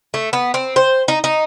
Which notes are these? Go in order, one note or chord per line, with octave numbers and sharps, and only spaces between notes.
A3
B3
C4
C5
D#4
D#4